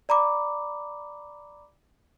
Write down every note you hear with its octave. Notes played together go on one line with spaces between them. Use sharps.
D5 A#5 B5 D6